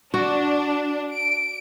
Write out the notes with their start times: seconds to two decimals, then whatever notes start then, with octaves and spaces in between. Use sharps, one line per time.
0.14 D4 F#4
1.13 D7